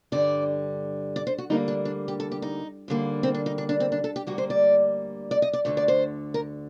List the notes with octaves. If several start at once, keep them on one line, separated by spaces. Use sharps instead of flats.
G2 D3 G3 D5
D5
C5
F#4
D2 D3 G3 A#3 D#4
D4
D4
G4
A4
G4
D#4
D#2 D3 G3 A#3
C4
D4
D#4
D4
D4
C4
D4
A4
G4
D2 D3 G3 A#3 F#4
C5
D5
D5
D#5
D5
D2 D3 A3 D5
D5
C5
A#4